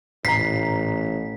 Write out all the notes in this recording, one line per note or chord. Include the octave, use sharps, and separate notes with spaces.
A1 A2 A#5 B6 C7